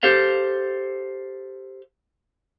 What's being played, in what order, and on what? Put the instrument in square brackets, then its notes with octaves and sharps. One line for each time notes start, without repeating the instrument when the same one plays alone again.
[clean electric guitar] G4 A4 C5 F5